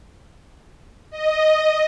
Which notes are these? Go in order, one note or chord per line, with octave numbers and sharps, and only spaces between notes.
D#5